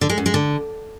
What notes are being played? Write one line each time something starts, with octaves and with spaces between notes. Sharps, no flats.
D3
G#3
F#2
G#3
D3